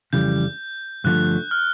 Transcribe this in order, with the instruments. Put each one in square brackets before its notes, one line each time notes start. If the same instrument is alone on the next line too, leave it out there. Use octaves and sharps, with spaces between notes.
[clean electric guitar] F2 C#3 E3 G3 [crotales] G6
[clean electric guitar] G2 D3 F3 A3 [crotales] F#6
[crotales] F6